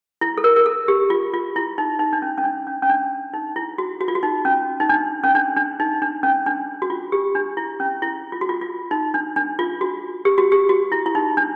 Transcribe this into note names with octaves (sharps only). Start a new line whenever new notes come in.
E4
A4
A#4
A#4
A4
G4
F4
F4
E4
D#4
D#4
D4
C#4
C#4
D4
C#4
C#4
D4
D#4
E4
F#4
F#4
F4
F#4
D#4
C#4
D#4
D4
C#4
D4
D4
D#4
D4
C#4
D4
F#4
F4
G4
D4
E4
C#4
E4
F4
F#4
F4
F4
D#4
D4
D4
F4
F#4
G4
F#4
G4
F#4
E4
E4
D#4
D4